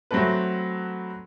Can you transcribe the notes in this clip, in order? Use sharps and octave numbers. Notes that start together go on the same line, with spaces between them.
F#3 A3 C4 A4 B4